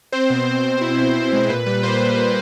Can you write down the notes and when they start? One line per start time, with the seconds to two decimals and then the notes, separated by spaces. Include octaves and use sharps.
0.12 C4 C5
0.30 B2
0.47 B2
0.64 C4
0.81 E4
0.98 B2
1.15 B2
1.33 G#3
1.49 A#2 B4
1.66 G3 B4
1.83 A#3 C5
2.01 G3
2.18 A#3